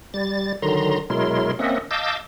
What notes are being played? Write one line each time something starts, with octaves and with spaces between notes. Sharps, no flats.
G3 A6
D3 D#3 F#3 A#5 C6
B2 F#3 G#3 E4 A#4 C6
A#3 C4 C#4 D#5 E5 F#5
D#5 F5 A5 D6 E6 G6